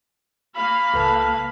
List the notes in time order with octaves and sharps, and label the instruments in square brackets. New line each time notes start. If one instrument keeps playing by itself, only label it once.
[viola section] A#3 F5 [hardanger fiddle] B5
[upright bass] C#2 [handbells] A4 B4 A5